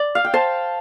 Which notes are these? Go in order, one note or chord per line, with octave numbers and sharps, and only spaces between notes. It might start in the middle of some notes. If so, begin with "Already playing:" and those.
Already playing: D5
F5
G5
C5 A5